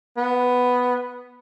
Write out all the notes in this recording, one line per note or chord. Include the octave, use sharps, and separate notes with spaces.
B3